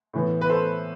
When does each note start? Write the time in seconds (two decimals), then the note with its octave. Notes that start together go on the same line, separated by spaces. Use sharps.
0.13 A2 E3 B3
0.41 B4
0.49 A4 C5